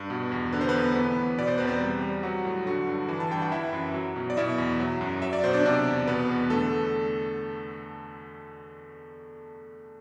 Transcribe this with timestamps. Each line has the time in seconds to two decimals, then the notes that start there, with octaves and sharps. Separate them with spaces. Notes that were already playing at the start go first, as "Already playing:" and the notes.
Already playing: G2
0.10 B2
0.32 E2
0.53 D3 B4
0.61 C5
0.69 B3 B4
0.74 E2
0.95 E3 B3 B4
1.17 A2
1.38 B2 D5
1.47 C5
1.58 E2 B4
1.67 C4 C5
1.80 G3
2.02 G3
2.23 F#3 F#4
2.45 A2
2.66 D3 F#4
2.87 G2
3.09 E3
3.20 A5
3.31 G2 G5
3.42 F#5
3.51 E3 E4 E5
3.73 F#2
3.94 F#3
4.16 B2
4.30 D5
4.37 B2 E4 E5
4.58 E2
4.80 F#3
5.01 F#2
5.22 F#3 E5
5.33 D5
5.44 B2 C5
5.53 D4 D5
5.65 C3 D4 D5
5.87 E2
6.07 B2 B3 B4
6.29 E2
6.42 B4
6.50 D3 A3 A4